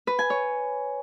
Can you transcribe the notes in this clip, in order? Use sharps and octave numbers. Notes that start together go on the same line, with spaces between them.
B4
G#5
C#5